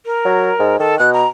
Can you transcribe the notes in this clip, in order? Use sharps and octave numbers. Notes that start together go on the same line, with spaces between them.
A#4
F#3
G#2
D#3 A4
B2 F#6
A#5